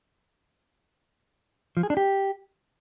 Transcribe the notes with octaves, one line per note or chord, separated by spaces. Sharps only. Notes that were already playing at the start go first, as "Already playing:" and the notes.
F3
G#4
D4
G4